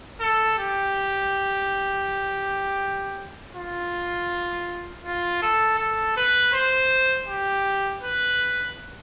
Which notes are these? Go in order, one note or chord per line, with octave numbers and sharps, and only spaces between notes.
A4
G4
F4
F4
A4
A4
B4
C5
G4
B4